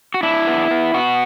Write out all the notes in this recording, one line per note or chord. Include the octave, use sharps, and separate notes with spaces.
F#4
D4 E4
B3
B3
B3 F#4